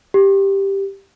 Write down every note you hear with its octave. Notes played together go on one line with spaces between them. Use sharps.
G4